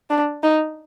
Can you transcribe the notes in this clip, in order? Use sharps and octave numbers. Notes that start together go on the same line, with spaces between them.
D4
D#4